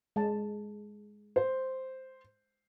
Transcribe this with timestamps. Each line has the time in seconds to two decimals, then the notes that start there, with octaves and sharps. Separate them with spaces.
0.16 G#3 A5
1.36 C5